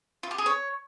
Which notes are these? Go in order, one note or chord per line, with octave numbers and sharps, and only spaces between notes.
F4
G4
G#4
C#5